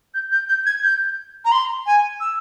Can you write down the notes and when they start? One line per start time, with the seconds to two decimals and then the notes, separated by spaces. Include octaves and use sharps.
0.14 G6
0.32 G6
0.49 G6
0.66 G#6
0.83 G6
1.45 A#5
1.52 C6
1.86 G#5
2.20 E6